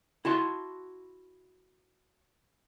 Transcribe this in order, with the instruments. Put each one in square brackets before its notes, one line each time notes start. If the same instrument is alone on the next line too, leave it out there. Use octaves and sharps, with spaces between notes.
[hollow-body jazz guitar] E4 F#4 A5 C6